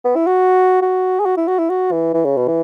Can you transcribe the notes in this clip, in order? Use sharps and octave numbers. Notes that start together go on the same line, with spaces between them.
B3
E4
F#4
F#4
G#4
F#4
E4
F#4
E4
F#4
E3
E3
C#3
B2
E3